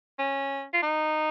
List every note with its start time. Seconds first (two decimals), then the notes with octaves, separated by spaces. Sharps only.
0.19 C#4
0.73 F4
0.82 D#4